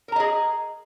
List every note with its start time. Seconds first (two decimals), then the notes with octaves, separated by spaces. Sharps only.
0.08 A#4
0.12 A#5
0.16 D#5
0.20 G#4